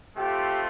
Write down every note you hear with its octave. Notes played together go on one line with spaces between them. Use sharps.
A3 C4 F4 G4